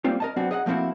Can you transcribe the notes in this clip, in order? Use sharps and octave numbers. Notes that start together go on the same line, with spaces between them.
G3 A3 A#3 C4 F4
A#4 D#5 A5
F#2 B3 C4 D4 F#4
G#4 D#5 F5 F#5
F3 A3 A#3 C4 E4 F#4